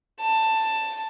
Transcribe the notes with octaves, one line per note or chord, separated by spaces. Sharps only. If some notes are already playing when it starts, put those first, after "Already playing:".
A5